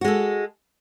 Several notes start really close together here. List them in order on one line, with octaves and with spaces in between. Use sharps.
F#4 G#3 A4